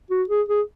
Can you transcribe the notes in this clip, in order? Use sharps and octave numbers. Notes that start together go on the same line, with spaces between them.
F#4
G#4
G#4